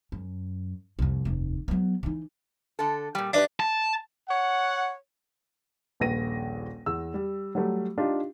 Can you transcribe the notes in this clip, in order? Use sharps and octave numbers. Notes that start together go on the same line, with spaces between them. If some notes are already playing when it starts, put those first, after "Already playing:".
F#2
C2 F2
F1 D#2
F#3 B3
E3 D#4
D3 A4
A#2 G3
D4 G4 B4 E5
A5
C#5 F#5
D#1 A#1 B4 A#6 D#7
E2 E6
G3
F#3 G3 A3
D4 D#4 F4 G4